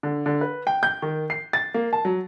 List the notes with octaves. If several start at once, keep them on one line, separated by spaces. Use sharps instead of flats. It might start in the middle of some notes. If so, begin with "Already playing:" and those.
D3
D3
B4
G5
G6
D#3
C7
A6
A#3
A5
F#3